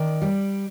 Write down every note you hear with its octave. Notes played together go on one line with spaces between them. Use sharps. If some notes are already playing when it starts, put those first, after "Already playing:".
Already playing: D#3 D5
G3